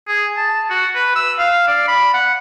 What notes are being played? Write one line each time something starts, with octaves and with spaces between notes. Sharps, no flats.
G#4
A5
F#4
B4
E6
F5
D5
B5
F#5